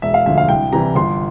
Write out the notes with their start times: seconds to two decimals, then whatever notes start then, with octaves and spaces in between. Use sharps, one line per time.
0.02 E1 E5
0.14 F5
0.26 D2 D3 F3 E5
0.38 F5
0.49 C2 G5
0.72 C3 E3 G3 A#5
0.95 G1 C6